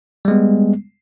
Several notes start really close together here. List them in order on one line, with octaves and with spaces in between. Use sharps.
G3 G#3 B3